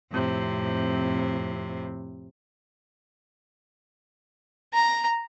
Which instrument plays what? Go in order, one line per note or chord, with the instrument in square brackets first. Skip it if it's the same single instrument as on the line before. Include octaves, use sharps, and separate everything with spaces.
[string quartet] F2 A2 C3
[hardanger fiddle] A#5